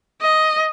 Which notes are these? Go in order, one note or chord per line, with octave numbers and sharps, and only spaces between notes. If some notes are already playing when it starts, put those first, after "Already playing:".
D#5